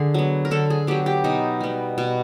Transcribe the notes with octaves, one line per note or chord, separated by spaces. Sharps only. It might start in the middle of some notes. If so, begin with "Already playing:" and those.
Already playing: D3 G#4
F#3 B3
A#4
D3 A4
G#4
F#3 B3 G4
G4
B2 D#4
G3 B3
B2